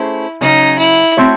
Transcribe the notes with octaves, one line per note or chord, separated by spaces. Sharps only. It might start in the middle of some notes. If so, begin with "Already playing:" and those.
Already playing: A3 C#4 E4 G#4 C5
C#3 F#3 C#4 D#4
E4
A3 C4 F#4 C#5 E5